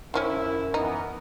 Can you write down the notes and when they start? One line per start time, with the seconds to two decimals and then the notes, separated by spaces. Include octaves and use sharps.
0.14 F#2 D#3 F3 C#4 E4
0.74 E3 B3 D#4 A#4